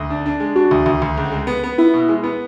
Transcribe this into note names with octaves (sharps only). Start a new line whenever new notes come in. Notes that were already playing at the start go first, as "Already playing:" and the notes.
Already playing: D2
D4
D4
G#3
D4 F#4
D2
D2
D2
C#2
G#3
B3
B3
B3 E4
B2
G#3
B3